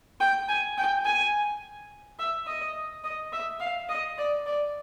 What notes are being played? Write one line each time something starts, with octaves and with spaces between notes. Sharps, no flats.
G5
G#5
G5
G#5
E5
D#5
D#5
E5
F5
D#5
D5
D5